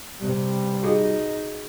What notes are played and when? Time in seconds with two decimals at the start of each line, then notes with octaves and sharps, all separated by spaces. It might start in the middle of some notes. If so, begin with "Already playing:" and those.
0.21 C3 G3
0.83 D#4 F#4 G#4